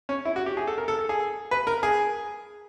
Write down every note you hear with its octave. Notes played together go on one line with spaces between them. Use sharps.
C#4
E4
F#4
G4
G#4
A4
A#4
A4
A4
G#4
B4
A#4
G#4